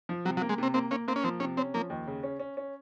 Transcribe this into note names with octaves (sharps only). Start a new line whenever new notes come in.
F3
C3 F#3
F#3
A#3
G#3
C3 C4
A#3 C4
A#3 C#4
A#3 C4
C#4
F3 C4
C3 C#4
C4 C#4
F3 A#3
D#2
C#3
C#4
C#4
C#4